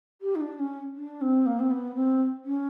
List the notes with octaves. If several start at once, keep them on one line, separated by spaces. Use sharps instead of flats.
G4
D#4
D4
C#4
D4
C4
A#3
C4
B3
C4
C#4